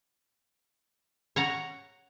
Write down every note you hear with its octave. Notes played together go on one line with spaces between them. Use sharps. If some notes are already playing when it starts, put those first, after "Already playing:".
C#5 F#5 A#5